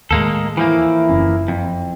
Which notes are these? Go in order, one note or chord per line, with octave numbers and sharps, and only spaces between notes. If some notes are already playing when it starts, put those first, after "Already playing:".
D#2 A2 G#3 A#3 A4
E3 F3 A#3 E4
F#1 C#4
F2